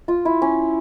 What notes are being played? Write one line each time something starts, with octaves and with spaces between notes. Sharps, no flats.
F4
E4
C#4